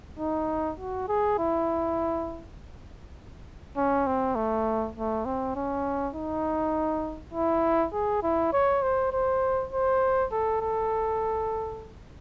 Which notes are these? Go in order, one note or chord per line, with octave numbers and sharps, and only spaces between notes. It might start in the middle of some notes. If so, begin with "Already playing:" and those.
D#4
F#4
G#4
E4
C#4
C4
A3
A3
C4
C#4
D#4
E4
G#4
E4
C#5
C5
C5
C5
A4
A4